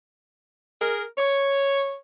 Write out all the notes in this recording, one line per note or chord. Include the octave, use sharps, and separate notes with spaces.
G#4 A#4
C#5